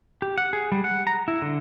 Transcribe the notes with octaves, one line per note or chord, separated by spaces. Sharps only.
G4
F#5
G#4
G3
F#5
A#5
E4
D3